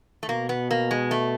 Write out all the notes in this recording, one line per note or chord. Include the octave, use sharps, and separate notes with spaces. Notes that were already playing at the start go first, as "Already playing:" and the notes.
A3
B2 A#3
B3
A#3
G#3
A3